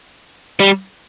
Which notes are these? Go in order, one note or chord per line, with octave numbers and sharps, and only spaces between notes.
G3